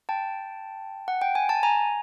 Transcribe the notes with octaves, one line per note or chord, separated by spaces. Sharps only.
G5 A5
F#5
G5
G#5
A5
G#5 A#5